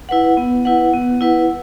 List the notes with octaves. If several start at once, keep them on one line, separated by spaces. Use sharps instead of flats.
E4 B4 F#5
B3
E4 B4 F#5
B3
E4 B4 F#5